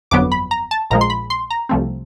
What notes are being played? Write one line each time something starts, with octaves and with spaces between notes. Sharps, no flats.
G1 F2 D3 F#3 B3 D6
B5
A#5
A5
A#1 A#2 F3 G#3 A#5
C6
B5
C6
A#5
C2 C3 F3 A3 C4